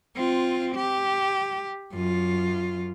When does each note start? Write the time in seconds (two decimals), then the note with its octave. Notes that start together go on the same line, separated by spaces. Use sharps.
0.16 C4 F4
0.75 G4
1.93 F#2 F4